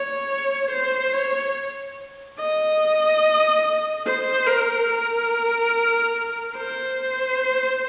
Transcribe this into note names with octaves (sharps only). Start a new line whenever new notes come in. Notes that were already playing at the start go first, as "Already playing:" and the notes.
Already playing: C#5
C5
C#5
D#5
C5
A#4
A#4
C5